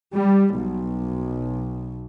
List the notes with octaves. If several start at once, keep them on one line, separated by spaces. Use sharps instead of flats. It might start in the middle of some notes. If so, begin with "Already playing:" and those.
G3
B1